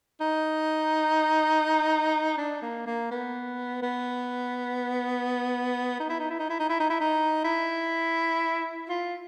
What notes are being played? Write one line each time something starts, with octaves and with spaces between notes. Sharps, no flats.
D#4
D4
A#3
A#3
B3
B3
D#4
E4
D#4
E4
D#4
E4
D#4
E4
D#4
E4
D#4
E4
F4